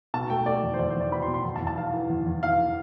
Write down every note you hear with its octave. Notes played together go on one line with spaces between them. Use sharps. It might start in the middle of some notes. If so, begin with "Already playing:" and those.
B2 A5
A3 G5
A3 D5
E2
C5
E2 D5
C5
E2
D5
B2 B5
C6
B2
C6
E2
A5
E2
A5
E3 F5
E3
E2
E2
E2 F5